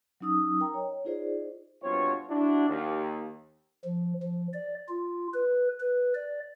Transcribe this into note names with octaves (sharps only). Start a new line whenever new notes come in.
F#3 C#4 D#4 D#6 E6
A#4 G5 A#5
C#5 D#5
D#4 F4 G#4 C5 D5 D#5
G2 B2 C4 F4 C5 C#5
D4 E4 F#4
D#2
F3
F3
D5
F4
B4
B4
D5